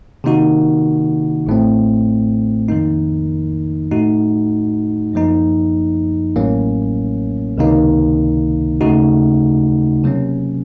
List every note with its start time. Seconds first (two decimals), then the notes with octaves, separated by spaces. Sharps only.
0.24 C3 D#3 A#3 D#4 F#4
1.46 A1 A2 A3 C4
2.69 F2 D#3 A#3 D#4
3.91 A2 A3 D#4 F#4
5.13 F#2 F3 A#3 D#4
6.36 A1 A2 F#3 A#3 C#4
7.58 C#2 C3 D#3 A#3 D#4
8.81 D#2 C#3 A3 D#4 F#4
10.03 C3 F#3 A#3 C#4